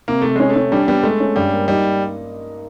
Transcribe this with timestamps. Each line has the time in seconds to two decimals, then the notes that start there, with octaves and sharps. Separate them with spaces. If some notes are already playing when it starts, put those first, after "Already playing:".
0.08 C3 A#3
0.22 C3 A3
0.36 G#3 C#4
0.50 A3
0.56 C#4
0.72 G3 D4
0.87 G3 B3
1.04 G#3 A3
1.20 C#4
1.36 G2 G3
1.52 A#3
1.68 G3 D#4